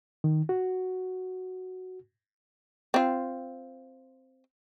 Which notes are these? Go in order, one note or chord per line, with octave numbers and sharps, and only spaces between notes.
D#3
F#4
C4 F4